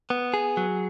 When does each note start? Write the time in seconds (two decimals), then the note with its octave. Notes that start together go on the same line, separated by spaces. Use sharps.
0.10 B3
0.34 G#4
0.57 F#3